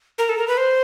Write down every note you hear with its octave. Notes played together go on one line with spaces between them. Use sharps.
A#4
A4
A#4
B4
C5